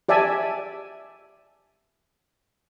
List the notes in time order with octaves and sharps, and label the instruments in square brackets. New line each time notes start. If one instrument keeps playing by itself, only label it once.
[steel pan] G4 D5 E5 G#5 A5